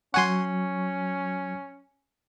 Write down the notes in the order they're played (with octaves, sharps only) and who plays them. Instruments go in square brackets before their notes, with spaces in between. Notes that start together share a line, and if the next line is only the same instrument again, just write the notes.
[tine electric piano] F#3 C#6 [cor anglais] C#4 [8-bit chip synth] F#5 G#5 C6